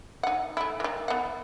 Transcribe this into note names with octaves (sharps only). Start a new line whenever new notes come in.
D#4 F#5
A3 E4
D#3 E3
B3 F#5